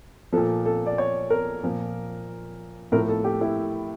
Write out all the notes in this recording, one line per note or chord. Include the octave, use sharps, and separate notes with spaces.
A#2 F3 A4
A4
D5
C#5
A#4
A#2 F3
A2 F3 A#4
A4
G4
E4